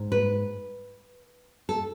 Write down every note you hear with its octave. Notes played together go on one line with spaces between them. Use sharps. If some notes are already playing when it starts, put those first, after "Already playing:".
Already playing: G#2
B4
A4